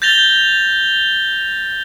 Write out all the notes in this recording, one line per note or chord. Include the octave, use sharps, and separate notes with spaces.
G6 A6 A#6 F7 G7